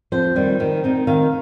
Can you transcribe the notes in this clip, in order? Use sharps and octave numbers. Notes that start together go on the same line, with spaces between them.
F2 C5
D#3 G3
D#3
C4 D#4
D#3 F5